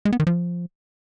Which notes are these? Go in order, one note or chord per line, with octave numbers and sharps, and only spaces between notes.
G#3
B3
D#3
F3